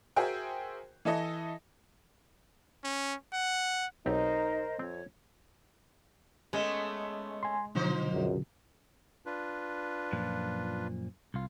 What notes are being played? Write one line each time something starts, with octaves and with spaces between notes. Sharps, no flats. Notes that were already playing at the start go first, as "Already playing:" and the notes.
F#4 G#4 A#4 C5 E5 G5
E3 E4 A4 D#5
C#4
F#5
B1 C4 D#4 G4 A#4 C5 D#5
F2 C4 C#5
G#3 A3 B3 C#4
G#5 C6
B2 D3 F3 F#3 D#4 C5
C#2 F#2
D4 F4 B4
F#2 A#2 F3
C2 F4